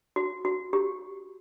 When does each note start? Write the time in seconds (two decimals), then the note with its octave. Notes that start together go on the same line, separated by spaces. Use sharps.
0.16 F#4
0.45 F#4
0.73 G4